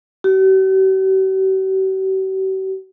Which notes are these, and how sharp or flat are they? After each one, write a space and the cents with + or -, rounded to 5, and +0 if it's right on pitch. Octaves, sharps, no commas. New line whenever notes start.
G4 -45